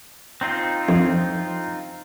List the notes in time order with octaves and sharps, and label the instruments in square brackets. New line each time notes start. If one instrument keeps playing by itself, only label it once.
[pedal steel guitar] C4 D#4 F4
[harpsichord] F2